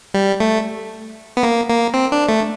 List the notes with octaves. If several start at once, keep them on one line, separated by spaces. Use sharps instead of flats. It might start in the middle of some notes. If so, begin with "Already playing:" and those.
G3
A3
B3
A#3
A#3
C4
D4
A3